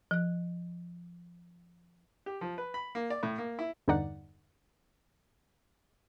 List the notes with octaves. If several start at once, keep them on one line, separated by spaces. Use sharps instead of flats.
F3 F#6
G4
F3
B4
B5
A#3
D5
A2
A#3
E4
E2 G2 D3 D#4 D5 F#5